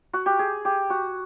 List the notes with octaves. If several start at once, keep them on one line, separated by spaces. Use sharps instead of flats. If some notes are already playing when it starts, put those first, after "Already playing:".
F#4
G4
G#4
G4
F#4